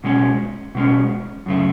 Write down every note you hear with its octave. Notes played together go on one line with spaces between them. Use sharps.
B2 G#3 C#4
B2 G#3 C#4
F#2 C#3 A3